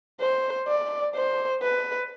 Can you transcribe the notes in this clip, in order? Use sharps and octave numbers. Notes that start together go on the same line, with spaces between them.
C5
D5
C5
B4